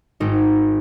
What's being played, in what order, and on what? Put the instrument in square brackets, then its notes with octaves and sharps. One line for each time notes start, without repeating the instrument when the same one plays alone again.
[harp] G#1 D#4